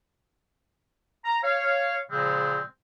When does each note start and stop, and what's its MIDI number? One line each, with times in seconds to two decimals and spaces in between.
1.25 1.38 82
1.44 1.98 73
1.44 1.98 77
2.11 2.62 46
2.11 2.62 49
2.11 2.62 53
2.11 2.62 56
2.11 2.62 60